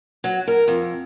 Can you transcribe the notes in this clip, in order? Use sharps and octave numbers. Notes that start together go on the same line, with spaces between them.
F#3
A#4
F2